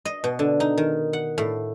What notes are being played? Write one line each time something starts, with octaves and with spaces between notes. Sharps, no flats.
D#5
B2
D3
D#4
D#3
F#5
A2